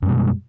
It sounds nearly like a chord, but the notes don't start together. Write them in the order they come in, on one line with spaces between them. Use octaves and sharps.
F#2 G3 B2 G#3